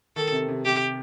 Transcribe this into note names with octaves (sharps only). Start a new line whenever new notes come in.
D#3 A4
C3
C3
C3 G4